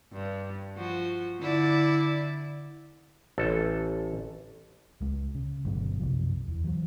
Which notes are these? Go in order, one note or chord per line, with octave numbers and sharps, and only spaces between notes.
G2
F3 F#4
D3 E4 D5
A1 A4
C#2 G#3
C#3
G1 G2 B2 F#3
B1 F#2 C3 F3
E2
E3 F#3